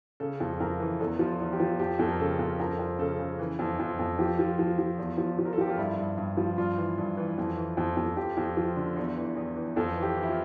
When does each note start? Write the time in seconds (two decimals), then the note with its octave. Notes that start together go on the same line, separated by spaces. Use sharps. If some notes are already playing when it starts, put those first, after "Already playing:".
0.20 C#3 A4
0.40 F2
0.60 F2 A#4
0.80 E3
1.00 E2 A4
1.19 F3
1.26 F4
1.40 E2
1.53 G4
1.60 F3
1.79 F2 G4
1.99 F2 A4
2.10 A#4
2.19 C#3 A4
2.39 F2 A#4
2.59 F2 A#4
2.79 F2
2.99 C#3 A4
3.19 C#3
3.39 E3
3.59 F2
3.79 F2
3.99 F2
4.18 F3 G4
4.39 F3
4.59 F3
4.79 F3
4.98 E2
5.18 F3
5.39 F3
5.45 A#4
5.53 A4
5.58 F3 G4
5.70 F4
5.77 G2 E4
5.98 G2
6.18 G2
6.37 F3
6.58 G2 F4
6.77 E3
6.98 G2
7.17 E3
7.38 F2
7.57 E3
7.77 F2
7.97 F2
8.17 F2 G4
8.37 F2
8.57 F3
8.76 D3
8.96 E2
9.16 E3
9.37 E2
9.56 E3
9.76 F2 A4
9.96 E3
10.03 G4
10.17 E3
10.23 E4
10.29 F4